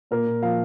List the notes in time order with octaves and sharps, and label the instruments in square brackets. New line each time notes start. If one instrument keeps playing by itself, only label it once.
[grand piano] A#2 A#4
A#2
F3 F5